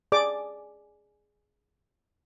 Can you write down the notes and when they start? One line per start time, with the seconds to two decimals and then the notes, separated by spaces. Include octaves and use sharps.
0.12 G#4 D5 D6